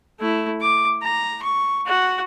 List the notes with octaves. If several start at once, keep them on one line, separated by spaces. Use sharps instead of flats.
A3 E4
D6
A#5
C#6
F#4 F#5